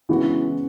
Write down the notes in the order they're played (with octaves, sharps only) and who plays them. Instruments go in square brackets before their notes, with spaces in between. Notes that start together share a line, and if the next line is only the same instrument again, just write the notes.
[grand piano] C#3 G#3 B3 D4 F#4 [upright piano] E3